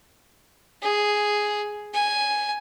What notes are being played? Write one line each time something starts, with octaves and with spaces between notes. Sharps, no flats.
G#4
G#5